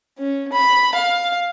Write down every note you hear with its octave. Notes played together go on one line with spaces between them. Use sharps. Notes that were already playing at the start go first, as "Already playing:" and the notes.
C#4
B5
F5